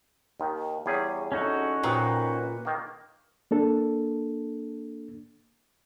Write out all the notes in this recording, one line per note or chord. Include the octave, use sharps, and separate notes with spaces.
D#2 D#3
E2 G3 G#4 C#5
C#4 D#4 F#4 A4
F2 A#2 D#3 F#3 B4
D#3 A#3
A#3 D4 A4